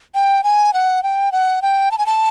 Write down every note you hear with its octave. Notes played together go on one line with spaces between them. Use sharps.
G5
G#5
F#5
G5
F#5
G5
A5
G#5
A5